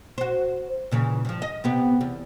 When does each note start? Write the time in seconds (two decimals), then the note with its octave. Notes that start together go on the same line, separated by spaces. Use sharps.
0.18 F#4 C5
0.91 A#2 C#3 E3
1.25 G2 F3
1.42 D#5
1.64 C3 B3 G4
2.01 E2